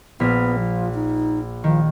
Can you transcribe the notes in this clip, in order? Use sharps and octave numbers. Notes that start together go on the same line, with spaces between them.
A#1 B3 F6 B6
F3
D#4
D#3 F3